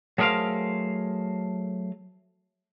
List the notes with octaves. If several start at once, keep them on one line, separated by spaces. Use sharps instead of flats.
F#3 A3 G#4 A#4 C5 F5